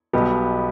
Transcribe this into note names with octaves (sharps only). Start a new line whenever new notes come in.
B1 B2 G3 B3 G4